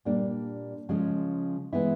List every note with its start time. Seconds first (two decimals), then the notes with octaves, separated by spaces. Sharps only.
0.05 A#2 G3 A#3 D4
0.89 C#3 F3 G#3 C#4
1.73 E3 G#3 B3 E4